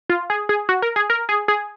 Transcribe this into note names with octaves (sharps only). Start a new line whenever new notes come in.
F4
G#4
G#4
F#4
A#4
G#4
A#4
G#4
G#4